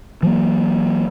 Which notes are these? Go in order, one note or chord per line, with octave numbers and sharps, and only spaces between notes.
E3 F#3 A#3